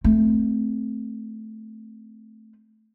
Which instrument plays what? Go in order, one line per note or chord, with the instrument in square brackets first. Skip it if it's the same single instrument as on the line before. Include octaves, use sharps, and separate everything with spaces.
[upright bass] A3 C4